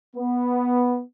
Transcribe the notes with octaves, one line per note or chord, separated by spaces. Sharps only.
B3